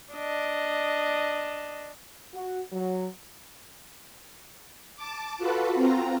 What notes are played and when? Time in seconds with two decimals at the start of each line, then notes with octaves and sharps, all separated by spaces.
0.13 D4 D#5
2.34 F#4
2.73 F#3
4.96 A5 D6
5.38 F4 F#4 A4 B4
5.75 C4 F4 A#5